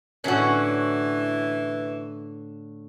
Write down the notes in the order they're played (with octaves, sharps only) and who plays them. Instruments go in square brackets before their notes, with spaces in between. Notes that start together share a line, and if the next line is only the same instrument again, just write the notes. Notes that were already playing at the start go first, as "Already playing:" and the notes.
[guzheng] A2 D3 [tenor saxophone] E3 [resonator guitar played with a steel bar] C#4 F#4